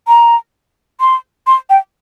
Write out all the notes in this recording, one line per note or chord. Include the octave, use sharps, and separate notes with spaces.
A#5
C6
C6
G5